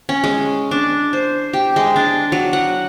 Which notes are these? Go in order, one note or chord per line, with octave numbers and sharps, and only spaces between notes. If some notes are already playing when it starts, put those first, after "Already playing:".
C#4
G#3
D4
C5
G4
G#3
D4
F#3
F#5